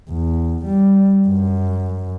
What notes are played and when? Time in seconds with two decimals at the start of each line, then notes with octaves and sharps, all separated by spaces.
0.10 E2
0.65 G3
1.28 F#2